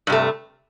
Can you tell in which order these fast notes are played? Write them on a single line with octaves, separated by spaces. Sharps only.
G2 C3 A3